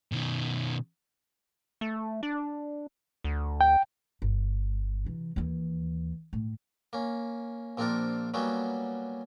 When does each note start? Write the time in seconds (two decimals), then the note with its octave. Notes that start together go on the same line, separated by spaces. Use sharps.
0.12 B2 D#3
1.81 A3
2.23 D4
3.24 D2
3.61 G5
4.22 G1
5.05 C3 E3
5.36 D#2 E3
6.33 A2
6.93 A#3 C#4
7.77 A#1 A#3 C4 D4 F4 A#4
8.34 F#3 G3 A#3 B3 C#4